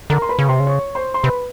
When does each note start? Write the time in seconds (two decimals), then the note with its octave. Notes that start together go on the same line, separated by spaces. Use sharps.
0.10 D3 A#4 A#5
0.22 C6
0.29 B4 B5
0.39 C#3
0.48 C3 C5 C6
0.60 C#3
0.67 C#5 C#6
0.95 C5 C6
1.14 C6
1.23 C3 B4 B5